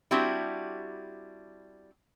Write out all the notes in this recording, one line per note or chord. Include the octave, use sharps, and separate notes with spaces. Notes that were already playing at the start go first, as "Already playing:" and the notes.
G3 C4 D4 E4 F#4 G4